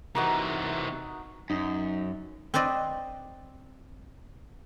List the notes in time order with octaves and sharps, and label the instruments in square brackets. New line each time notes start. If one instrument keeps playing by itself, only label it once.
[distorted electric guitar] C3 E3 [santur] D#4 F#4 A#4
[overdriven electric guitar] F#2 [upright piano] D#4
[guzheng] C4 B4 C5 D5 D#5